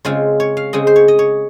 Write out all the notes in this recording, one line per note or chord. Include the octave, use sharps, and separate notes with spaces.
C#3 G#3 C4 F4
C#5
F5
C#3 G#3 C4 D#5
C5
C#5
D#5
C#5